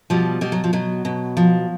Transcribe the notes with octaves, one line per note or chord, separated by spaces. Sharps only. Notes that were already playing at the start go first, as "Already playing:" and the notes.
B2 F3 G3
B2 G3
F#3
F3
B2 F#3
B2
F3